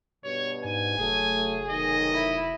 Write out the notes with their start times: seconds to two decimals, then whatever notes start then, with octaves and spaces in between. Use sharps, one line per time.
0.24 G2 B2 C#5
0.64 G#2 G#5
0.97 F1 F#3 A3 G#4
1.70 B1 D#3 D#5
2.13 E4